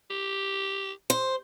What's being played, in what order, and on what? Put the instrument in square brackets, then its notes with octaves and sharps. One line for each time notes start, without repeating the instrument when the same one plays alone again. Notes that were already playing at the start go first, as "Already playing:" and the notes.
[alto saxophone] G4
[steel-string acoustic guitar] C5